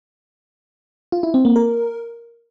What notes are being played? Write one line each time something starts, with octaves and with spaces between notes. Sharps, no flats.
F4
E4
C4
A#3
A#4